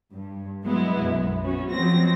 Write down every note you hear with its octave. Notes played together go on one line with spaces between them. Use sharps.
G2
F#3 G#3 B3 E4
B1 F#2
B3 C#4 F#4
F3 F#3 G#3 C4 A#6